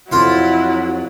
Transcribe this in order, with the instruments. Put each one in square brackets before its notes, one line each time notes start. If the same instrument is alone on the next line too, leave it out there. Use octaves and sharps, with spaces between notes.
[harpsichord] F2 F4 C6 [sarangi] F#3 [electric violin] E4